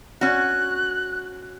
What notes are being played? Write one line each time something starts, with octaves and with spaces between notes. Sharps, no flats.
C#4 F#4 F#6